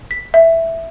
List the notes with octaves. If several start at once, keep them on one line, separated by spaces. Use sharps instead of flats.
B6
E5